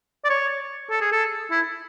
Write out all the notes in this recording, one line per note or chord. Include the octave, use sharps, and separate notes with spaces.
D5
C#5
A4
G#4
A4
E4